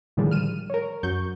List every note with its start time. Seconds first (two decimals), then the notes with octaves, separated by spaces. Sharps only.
0.17 A2 D3 D#3 F3 G3 G#3
0.31 F6 D#7 E7
0.70 A#4 C#5
1.03 F#2 F#3 C#6 G6